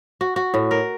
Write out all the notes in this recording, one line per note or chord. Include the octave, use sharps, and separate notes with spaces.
F#4
F#4
A2
A#4